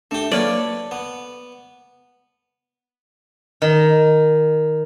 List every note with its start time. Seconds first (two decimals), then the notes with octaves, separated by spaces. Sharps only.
0.11 A3 D4 G4
0.32 F#3 A#3 A4 B4 C#5 D5
0.91 B3
3.62 D#3